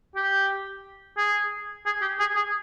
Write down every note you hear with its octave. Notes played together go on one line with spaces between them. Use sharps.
G4
G#4
G#4
G4
G#4
G#4